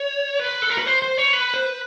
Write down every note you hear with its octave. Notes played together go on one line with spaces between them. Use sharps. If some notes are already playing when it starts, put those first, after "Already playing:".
Already playing: C#5
B4
A4
A#4
B4
C5
C5
C#5
B4
C5
B4